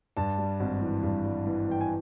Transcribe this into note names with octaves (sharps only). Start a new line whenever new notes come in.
G2 A5
G3
G#1
E3
G2
G3
E3
E3 G5
G#5